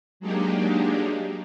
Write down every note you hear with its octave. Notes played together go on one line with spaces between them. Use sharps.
F#3 G#3 A#3 D4 D#4 G4